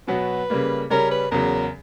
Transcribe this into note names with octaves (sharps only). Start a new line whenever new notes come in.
B2 F#3 B3 F#4 B4
C#3 G3 A#3
C#3 G3 C#4 A#4
B4
E2 C#3 F#3 A#4